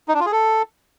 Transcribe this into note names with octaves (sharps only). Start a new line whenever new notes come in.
D#4
D4
F4
G#4
A4